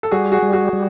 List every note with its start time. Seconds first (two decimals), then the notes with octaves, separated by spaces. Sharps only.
0.03 A4
0.11 G3 F#4 G#4
0.32 F#4 G#4
0.42 G3
0.53 F#4 G#4
0.73 G3